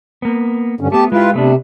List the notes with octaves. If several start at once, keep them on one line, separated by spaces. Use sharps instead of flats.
A#3 B3
G2 D3 C#4
A3 B3 G4 A5
G#3 E4 F4 G4 B4
C3 A3 B3 D4